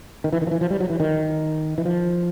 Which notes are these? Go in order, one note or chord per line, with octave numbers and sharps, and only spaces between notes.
D#3
E3
D#3
F3
E3
F3
G3
F#3
E3
D#3
E3
F3